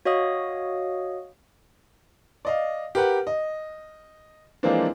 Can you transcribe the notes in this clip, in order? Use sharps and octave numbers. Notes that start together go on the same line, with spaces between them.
F#4 C#5 D#5 F5 D#6
D5 D#5 F5
G4 A#4 B4 F#5
D#5
E3 F3 G#3 A#3 C4 D4